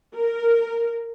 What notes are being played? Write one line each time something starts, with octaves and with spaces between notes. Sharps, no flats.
A#4